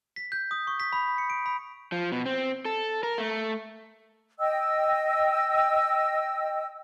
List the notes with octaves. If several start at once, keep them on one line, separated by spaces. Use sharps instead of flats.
B6
G6
D#6
C#6
B6
B5
C#7
D7
B5
F3
B2
C4
A4
A#4
A3
D#5 G5 E6